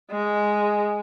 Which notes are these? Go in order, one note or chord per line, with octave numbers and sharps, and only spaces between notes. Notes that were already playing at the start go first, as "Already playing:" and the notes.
G#3